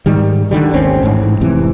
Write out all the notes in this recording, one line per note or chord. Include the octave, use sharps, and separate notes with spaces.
G#2 D#3 G3
D3 D#3 G3
G#1 D#2 C4 C#4
A1 G#2
F1 C3 E3